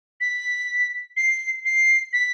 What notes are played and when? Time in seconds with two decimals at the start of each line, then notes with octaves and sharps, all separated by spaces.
0.21 B6
1.17 C7
1.65 C7
2.13 B6